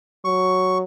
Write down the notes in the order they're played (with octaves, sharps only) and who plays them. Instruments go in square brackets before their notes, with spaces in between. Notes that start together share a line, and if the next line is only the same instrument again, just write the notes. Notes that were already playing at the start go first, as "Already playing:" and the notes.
[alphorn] F#3 [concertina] C#6